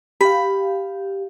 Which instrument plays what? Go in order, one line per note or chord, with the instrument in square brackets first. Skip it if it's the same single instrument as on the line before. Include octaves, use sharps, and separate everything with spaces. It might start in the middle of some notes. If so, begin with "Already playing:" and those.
[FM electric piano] G4 F5 [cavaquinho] B5